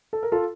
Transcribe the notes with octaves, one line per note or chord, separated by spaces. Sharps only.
A4
A#4
F4 A4